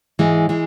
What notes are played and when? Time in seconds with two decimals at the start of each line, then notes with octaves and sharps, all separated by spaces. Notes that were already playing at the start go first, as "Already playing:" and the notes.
0.19 G#2 E3 G#3
0.49 E3 G#3